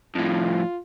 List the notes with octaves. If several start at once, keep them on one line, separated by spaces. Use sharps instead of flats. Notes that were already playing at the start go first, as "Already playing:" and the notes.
F2 A2 F4